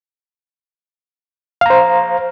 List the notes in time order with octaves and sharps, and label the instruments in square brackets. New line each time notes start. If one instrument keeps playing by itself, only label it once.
[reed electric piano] F5
A#5
C5